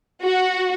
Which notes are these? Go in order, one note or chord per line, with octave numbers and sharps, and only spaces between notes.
F#4